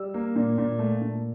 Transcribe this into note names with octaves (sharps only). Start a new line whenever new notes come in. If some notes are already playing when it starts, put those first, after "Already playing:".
Already playing: G3 E6
A#3
A#2
A#2
A3
A#2